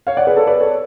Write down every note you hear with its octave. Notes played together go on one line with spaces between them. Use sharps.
C#5 F5
D5 F#5
G#4 B4
A4 C#5
B4 D5
A4 C#5